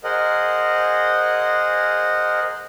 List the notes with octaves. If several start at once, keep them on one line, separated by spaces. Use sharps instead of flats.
G#4 A#4 C5 D#5 F#5